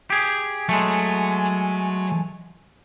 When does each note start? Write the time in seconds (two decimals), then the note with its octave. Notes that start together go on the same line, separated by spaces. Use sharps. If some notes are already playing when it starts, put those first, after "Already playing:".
0.10 G4 G#4
0.69 F#3 G#3 A3 G#5